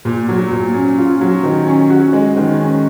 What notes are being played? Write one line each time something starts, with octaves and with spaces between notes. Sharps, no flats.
A#2
F#3
A#2
C#4
F4
F#3
D#3
C#4
F#4
G#3
D#3
C#4